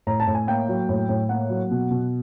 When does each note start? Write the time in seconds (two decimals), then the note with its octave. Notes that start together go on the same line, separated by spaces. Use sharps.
0.07 A2 A#5
0.20 A5
0.27 A2
0.35 G#5
0.47 A#3 G5
0.68 F#3
0.89 A2
1.09 A2
1.29 A#3 F#5
1.50 F#3
1.71 B2
1.91 B2